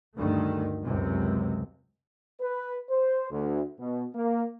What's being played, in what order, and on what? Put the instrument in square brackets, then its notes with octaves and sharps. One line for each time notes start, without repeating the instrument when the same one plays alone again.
[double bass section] D2 G2 D#3 A3
C#2 F#2 C3
[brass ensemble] B4
C5
D2
B2
A#3